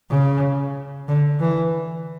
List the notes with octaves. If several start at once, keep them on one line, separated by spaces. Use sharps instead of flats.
C#3
D3
E3